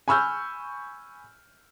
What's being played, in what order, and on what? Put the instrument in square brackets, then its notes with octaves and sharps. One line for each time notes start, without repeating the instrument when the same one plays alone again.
[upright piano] G#5 B5 C#6 E6 F6 G6